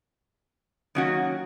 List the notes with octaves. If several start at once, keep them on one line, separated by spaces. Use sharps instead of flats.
D#3 F#3 A#3 C#4 F#4